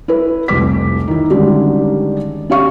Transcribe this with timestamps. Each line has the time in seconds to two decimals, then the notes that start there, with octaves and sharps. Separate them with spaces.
0.08 E4 B4
0.48 F1 C2 D6 B6
1.08 D#3 E4
1.30 D3 D#3 G3 G#3 C#4 G4
2.50 C#4 G4 F5 C#6